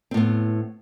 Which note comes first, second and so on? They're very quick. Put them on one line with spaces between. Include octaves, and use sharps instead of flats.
C4 A2 B3